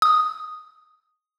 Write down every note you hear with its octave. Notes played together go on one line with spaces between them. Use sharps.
D#6